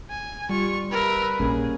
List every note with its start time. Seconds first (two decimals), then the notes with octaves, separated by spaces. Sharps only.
0.10 G#5
0.49 G3 F4 C#6
0.91 A#4 B4 E5
1.40 A#1 A#3 C#4 G#4